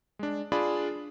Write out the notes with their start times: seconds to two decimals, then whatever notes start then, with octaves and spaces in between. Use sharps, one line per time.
0.19 G#3 D4
0.52 D4 F4 G#4 D5 B5